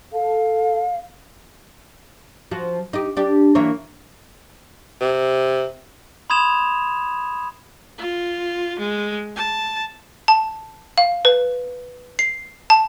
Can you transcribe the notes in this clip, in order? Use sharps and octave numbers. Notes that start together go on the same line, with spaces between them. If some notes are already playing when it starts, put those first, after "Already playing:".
A4 F5
F3 F#4
D#4 G4
D4 G4
E3 A#3 C#5
C3
B5 C6 D#6 G#6 E7 F7
F4
G#3
A5
A5
F5
B4
C7
A5